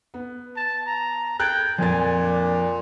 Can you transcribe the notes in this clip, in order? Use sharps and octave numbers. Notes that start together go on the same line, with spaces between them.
B3
A5
A#5
G5 F#6 G#6 A6
F2 A#2 G#5 A6
D4